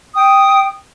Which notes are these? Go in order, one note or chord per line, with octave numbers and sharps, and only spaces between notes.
G5 D#6